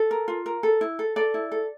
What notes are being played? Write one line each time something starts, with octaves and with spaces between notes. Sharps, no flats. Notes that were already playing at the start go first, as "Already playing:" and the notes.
Already playing: A4
A#4
F4
A#4
A4
E4
A4
A4 D5
E4
A4